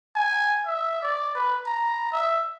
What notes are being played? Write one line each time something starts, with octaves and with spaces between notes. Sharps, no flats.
G#5
E5
D5
B4
A#5
E5